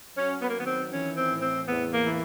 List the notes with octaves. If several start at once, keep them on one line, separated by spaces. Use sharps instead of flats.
F#3 C#4
B3
A#3
D#3 B3
C4
E3 C#4
C4
A2
C4
E2 B3
A#3
E3